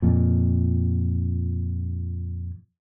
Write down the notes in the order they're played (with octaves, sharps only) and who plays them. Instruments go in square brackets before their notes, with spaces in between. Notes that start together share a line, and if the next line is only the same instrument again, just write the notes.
[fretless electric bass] F2 A#2